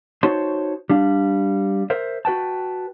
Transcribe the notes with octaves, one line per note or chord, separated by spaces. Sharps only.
D#4 F#4 C5 C#5 A5 C6
G3 D4 F5
A#4 C5 E5
F#4 B4 G5 A5